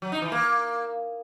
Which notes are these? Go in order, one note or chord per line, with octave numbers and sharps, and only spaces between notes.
F#3
D#4
E3
A#3